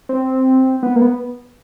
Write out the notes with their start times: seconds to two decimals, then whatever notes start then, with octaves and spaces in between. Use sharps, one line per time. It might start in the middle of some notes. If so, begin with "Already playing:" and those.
0.09 C4
0.83 B3
0.96 A#3
1.02 B3